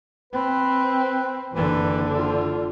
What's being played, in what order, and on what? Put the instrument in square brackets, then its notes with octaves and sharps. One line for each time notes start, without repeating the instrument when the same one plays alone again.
[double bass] C4 [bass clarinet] B4
[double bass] F#1 D3 [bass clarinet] E3
[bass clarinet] F4